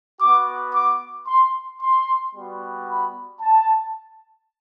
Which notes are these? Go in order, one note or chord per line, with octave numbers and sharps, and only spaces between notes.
B3 F#4 D6
D6
C6
C6
G3 B3 F#4
B5
A5